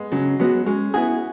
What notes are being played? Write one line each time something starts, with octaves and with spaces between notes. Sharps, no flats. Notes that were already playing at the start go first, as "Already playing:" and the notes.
Already playing: G#3 B3
C#3 F#3
F#3 G#3 B3 F#4
G#3 C#4
B3 E4 F#4 G#4